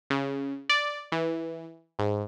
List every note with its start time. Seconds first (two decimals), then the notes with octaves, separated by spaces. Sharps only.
0.10 C#3
0.70 D5
1.12 E3
1.99 G#2